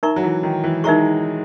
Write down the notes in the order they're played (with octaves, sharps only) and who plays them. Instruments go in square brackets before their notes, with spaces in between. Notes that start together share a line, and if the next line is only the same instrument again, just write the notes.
[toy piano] D#4 A#4 E5 A#5 C#6
[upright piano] F#3
E3
D#3
E3
[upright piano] G#3 [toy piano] D#4 A#4 E5 A#5 C#6